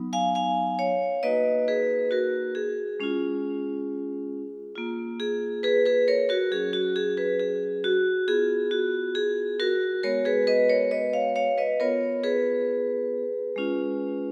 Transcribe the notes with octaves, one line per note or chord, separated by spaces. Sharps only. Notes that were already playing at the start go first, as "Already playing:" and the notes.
Already playing: F#3 B3 D#4
F5 G#5
F5 G#5
C#5 F5
A#3 D#4 F#4 B4 D#5
G#4 B4
F#4 A#4
G#4
G#3 C#4 F4
A#3 F4
G#4
G#4 B4
G#4 B4
A#4 C#5
F#4 A#4
F#3 C#4 F#4 G#4
F#4
G#4
G#4 B4
G#4
F#4
B3 F4 G#4
F#4
G#4
F#4 A#4
G#3 B3 F#4 A#4 C#5
G#4 B4
B4 D#5
A#4 C#5
B4 D#5
C#5 F5
C#5 F5
B4 D#5
B3 F4 A#4 C#5
G#4 B4
G#3 C#4 F4